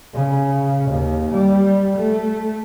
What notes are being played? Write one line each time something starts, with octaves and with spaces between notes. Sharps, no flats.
C#3
D#2
G3
A3